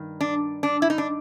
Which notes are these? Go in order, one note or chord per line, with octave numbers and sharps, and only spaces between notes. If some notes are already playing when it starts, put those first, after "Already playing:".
Already playing: G2 D#3
D4
D4
E4
D#4
D4